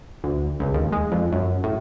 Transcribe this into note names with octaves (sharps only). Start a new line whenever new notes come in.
D2
C#2
D#2
G#3
F2
F#2
A2